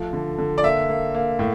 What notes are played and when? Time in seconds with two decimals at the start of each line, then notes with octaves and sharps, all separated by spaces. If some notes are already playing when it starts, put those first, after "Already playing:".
Already playing: F3 A3
0.13 D3
0.38 D3
0.58 D5
0.63 A#3 E5
0.89 A#3
1.14 A#3
1.39 A2